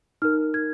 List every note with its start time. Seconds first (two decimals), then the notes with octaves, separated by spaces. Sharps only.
0.22 D#4 A#4 F6
0.54 G#6